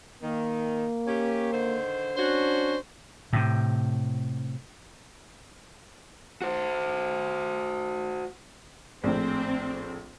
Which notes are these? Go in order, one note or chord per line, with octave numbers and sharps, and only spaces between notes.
D#3 A#3
C#4 G4
D3 D#3 C5
C#4 D4 F#4 C5
A2 C3
F#4 C5
A#1 A2 C4